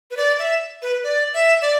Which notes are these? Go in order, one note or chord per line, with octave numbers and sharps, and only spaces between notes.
B4
D5
E5
B4
D5
E5
D5